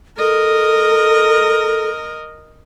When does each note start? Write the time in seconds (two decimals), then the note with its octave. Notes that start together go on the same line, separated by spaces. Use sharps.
0.18 A4 A#4 D#5